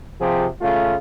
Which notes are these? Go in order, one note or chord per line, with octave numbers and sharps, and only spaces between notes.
C3 F3 F4 G4 G#4
C#3 A3 F4